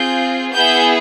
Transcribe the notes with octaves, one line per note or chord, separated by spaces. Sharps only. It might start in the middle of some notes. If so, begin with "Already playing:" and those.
Already playing: C4 F4 G#4 G6
B3 E4 G#4 G6